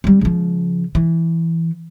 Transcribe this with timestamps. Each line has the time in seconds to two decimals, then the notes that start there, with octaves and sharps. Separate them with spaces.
0.04 G3 C4
0.21 C#3 F3
0.95 E3